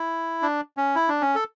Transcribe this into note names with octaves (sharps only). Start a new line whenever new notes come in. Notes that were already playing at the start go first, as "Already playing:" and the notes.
Already playing: E4
D4
C#4
E4
D4
C#4
A4